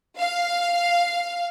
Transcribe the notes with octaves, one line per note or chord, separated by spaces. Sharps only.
F5